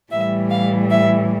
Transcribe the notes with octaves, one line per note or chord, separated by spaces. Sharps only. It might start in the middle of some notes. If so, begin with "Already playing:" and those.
A2 E3 G3 E5
F5
E5